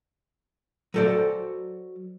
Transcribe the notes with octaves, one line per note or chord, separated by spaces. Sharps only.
F#3 F#4 A4 C5 D5